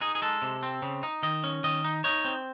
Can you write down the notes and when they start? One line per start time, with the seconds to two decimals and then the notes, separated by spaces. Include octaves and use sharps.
0.01 D#4 G#4
0.15 G#4
0.22 G#3 A4
0.42 C3
0.63 C4
0.82 C#3
1.03 D#4
1.23 D#3 D#5
1.44 C#4
1.64 D#3 D#5
1.84 D#4
2.04 D#4 C#5
2.25 C4